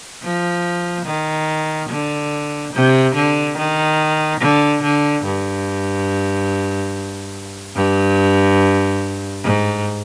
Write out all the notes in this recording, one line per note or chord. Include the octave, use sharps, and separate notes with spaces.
F3
D#3
D3
C3
D3
D#3
D3
D3
G2
G2
G#2